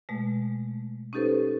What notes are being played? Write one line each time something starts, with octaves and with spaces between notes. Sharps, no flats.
B2 G#3 A3
C#4 D#4 G4 A4 B4 C5